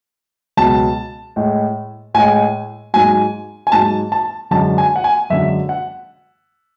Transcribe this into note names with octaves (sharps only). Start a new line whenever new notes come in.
C#2 B2 F#3 A5
A2 G#3
A2 G#3 G#5
G#2 F#3 G#5
G#5
G#2 F#3 A5
A5
F#2 D3 G#3 A5
G#5
F#5
G#5
F#2 D3 G#3 E5
F#5